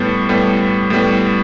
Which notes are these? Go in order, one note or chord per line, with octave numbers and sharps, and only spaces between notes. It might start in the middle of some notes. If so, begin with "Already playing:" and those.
Already playing: A2 G3 B3 A5
A2 G3 B3
A2 G3 B3